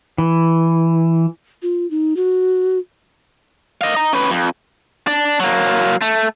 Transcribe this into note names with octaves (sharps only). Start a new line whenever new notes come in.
E3
F4
D#4
F#4
D#5 F5
D#5 A#5
C#4 B4
F2
D4
F#3 A#3
A3